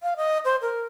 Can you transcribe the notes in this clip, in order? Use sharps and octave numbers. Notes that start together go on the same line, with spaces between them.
F5
D#5
C5
A#4